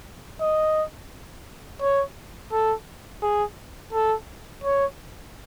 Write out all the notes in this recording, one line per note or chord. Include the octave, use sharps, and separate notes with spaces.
D#5
C#5
A4
G#4
A4
C#5